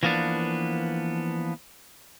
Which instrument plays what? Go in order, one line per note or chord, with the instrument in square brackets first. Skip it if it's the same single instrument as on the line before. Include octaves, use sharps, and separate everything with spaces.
[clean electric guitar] E3 F3 A#3 B3 D4